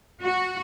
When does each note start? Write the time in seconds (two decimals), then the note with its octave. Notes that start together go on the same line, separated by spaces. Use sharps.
0.23 F#4